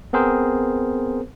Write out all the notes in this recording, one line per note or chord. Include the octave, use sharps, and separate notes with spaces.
B3 C4 G#4 A#4 C5